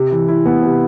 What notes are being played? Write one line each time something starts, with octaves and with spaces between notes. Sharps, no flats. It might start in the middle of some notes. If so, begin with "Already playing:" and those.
Already playing: C3
E3
E4
B3
C3